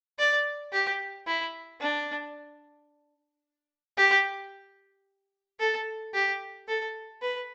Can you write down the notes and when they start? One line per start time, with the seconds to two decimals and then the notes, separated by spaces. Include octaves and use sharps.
0.19 D5
0.73 G4
1.27 E4
1.81 D4
3.97 G4
5.60 A4
6.14 G4
6.68 A4
7.22 B4